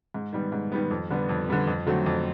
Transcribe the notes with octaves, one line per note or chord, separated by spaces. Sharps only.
G#2
D#3 G3 B3
G#2
D#3 G3 B3
F2
D3 G3 B3
F2
D3 G3 B3
F2
D3 F#3 A3 C4
F2